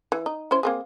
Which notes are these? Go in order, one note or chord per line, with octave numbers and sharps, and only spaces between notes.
E3
D#4
C#4 E4 C5
A#3 C4 G#4